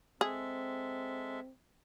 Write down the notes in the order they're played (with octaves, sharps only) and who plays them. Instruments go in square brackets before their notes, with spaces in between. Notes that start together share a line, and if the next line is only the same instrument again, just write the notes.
[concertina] G#3 A4 E5 [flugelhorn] C4 [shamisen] G#4